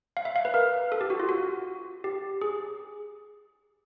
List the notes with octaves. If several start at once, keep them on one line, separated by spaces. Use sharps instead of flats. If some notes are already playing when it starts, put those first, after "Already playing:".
F5
E5
F5
B4
A#4
A4
G4
F#4
F4
F#4
G4
G#4